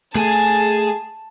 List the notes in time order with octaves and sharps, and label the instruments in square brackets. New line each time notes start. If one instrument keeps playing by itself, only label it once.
[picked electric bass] A3 [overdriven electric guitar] G#4 G#5 [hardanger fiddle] A5